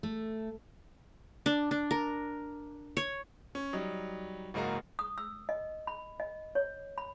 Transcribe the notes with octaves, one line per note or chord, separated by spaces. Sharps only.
A3
D4
D4
A#4
C#5
C#4
F#3 G3 D#4
F#1 G#2 A#3 D#4 F#4 A#5
D#6
E6
D#5
B5
D#5
C#5
B5